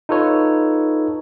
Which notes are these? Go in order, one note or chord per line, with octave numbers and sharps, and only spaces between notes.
D#4 F4 A4 B4 C#5